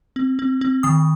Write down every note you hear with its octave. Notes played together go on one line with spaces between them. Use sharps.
C4
C4
C4
D#3 D#6